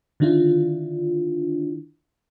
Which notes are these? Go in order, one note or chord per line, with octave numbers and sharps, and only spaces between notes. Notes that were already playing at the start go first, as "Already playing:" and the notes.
D3 D#3 D4 E4 F4